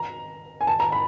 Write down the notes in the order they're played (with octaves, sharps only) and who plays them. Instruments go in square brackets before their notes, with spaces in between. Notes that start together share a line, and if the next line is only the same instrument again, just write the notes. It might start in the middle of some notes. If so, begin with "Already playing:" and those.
Already playing: [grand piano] A#5
G#5
A5
A#5
B5